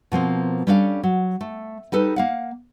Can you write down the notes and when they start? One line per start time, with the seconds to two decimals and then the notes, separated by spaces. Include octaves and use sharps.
0.12 B2 F3 A#3 C4
0.67 G3 C#4 D4 E4 A4 F5
1.03 F#3
1.41 A3
1.92 G3 D#4 A4 B4
2.16 A#3 F5 F#5